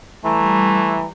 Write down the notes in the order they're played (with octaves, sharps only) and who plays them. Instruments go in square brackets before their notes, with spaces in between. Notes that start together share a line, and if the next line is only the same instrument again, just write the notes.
[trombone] E3 [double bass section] G3 [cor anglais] A3 [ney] A#5